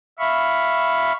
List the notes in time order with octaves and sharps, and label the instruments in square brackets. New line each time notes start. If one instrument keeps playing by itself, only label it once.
[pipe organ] E5 F5 B5 C#6